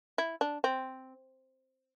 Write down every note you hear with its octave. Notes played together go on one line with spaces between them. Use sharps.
E4
D4
C4